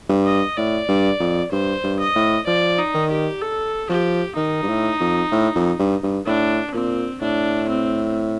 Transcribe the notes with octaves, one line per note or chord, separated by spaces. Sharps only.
G2
D#5
A2 D5
G2
F2
G2 C5
G2
D#5
A2
F3 D5
D#4
D#3
G4
A4
F3 G4
D#3 D#4
G2
A2
F2
A2
F2
G2
G2
A2 D4
A#2 C4
A2 D4
C4